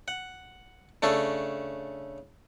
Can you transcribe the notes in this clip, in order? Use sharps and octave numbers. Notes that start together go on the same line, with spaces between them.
F#5
C#3 A3 C#4 D4 A4